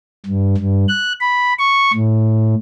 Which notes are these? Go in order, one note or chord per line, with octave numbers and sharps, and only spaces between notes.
G2
G2
F#6
B5
C#6
A2